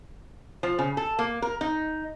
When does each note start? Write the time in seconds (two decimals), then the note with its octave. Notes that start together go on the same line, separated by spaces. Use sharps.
0.63 F3
0.79 C#3
0.97 A4
1.19 A#3
1.42 A#4
1.61 D#4